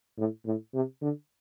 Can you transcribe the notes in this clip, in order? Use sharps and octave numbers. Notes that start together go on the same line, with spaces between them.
A2
A2
C3
D3